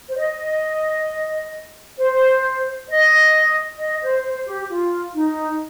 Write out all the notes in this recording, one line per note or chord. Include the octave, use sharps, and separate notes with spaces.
C5
D#5
C5
D#5
D#5
C5
C5
G4
F4
D#4